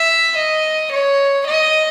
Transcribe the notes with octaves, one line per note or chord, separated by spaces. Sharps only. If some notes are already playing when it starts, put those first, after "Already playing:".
Already playing: E5
D#5
C#5
D#5